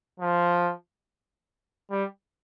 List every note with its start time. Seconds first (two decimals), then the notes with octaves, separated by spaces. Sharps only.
0.20 F3
1.91 G3